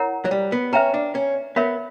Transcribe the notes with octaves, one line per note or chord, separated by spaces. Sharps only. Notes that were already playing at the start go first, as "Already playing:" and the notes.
Already playing: E4 A#4 C#5 F#5 A#5
F#3
G3
B3
C#4 B4 E5 G5 A#5
D4
C#4
B3 A#4 C#5 E5 B5